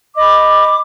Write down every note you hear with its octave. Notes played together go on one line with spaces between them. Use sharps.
D#5 B5 D6